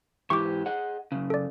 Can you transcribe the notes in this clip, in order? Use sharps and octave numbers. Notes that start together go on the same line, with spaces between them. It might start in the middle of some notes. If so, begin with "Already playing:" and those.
G#2 E3 G4 C#6 D6
G#4 D#5 F#5
F#2 C#3
A4 D5